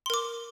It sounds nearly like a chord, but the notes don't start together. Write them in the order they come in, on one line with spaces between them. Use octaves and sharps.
C6 A#4 D6